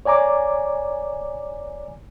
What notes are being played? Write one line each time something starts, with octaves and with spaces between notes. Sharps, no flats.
C#5 D5 G#5 A#5 D6